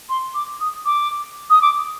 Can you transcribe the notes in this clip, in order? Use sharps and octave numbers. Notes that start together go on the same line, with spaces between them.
C6
D6
D#6
D6
D#6
D6